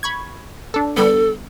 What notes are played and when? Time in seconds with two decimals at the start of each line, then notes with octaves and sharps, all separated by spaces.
0.03 B5 C#6 G#6
0.74 D4 A4
0.96 D3 G3 B3 A4